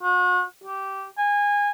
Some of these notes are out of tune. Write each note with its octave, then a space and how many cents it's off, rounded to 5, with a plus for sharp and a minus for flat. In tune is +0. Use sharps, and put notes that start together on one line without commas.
F#4 -40
G4 -15
G#5 -20